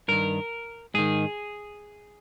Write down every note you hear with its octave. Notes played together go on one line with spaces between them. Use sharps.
G2 D#3 A#4
G#2 D#3 G#4